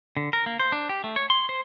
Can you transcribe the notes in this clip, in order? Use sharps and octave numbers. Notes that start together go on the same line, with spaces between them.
D3
A#4
A#3
C5
D4
G4
A3
C#5
C6
C5